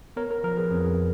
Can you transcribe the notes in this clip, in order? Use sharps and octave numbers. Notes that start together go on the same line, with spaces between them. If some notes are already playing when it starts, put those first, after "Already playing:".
B3 A#4 C#5
A#4
F3 A#4
G#4 B4
F2 G#4